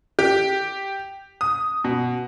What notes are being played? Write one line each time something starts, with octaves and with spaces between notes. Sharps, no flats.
G4
D#6
B2